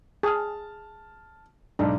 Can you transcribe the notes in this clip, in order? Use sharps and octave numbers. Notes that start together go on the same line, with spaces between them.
G#4 A5 F6
B1 G#2 D4